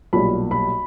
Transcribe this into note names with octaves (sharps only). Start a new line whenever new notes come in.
B1 A#2 G3 B5
B5